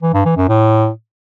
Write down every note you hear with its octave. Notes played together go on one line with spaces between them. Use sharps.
E3
G2
E3
F#2
A2